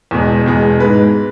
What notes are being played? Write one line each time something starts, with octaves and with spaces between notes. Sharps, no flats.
E2 B2 G#3
E2 B2 G#3
G#2 G#3 B4